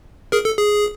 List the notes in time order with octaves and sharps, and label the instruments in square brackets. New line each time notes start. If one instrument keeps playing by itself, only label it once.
[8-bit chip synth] G#4 A#4
A4
G#4